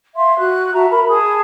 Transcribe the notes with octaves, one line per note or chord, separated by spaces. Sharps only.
E5 F5 C6
F#4 F#6
F#4 E5 A5 A#5
A#4 B5
G#4 G#5 A5 D#6